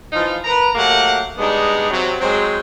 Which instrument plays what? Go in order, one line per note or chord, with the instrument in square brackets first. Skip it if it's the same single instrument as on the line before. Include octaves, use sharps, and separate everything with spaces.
[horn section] E3 F3 D#4 F4
A#4 B4 A#5
F#3 A3 A#3 G4 F#5
G3 G#3 B3 D4 D#4
C3 F#3
F#3 G#3 C4 C5